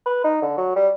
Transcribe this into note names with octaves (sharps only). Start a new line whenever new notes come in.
B4
D#4
D3
F#3
G3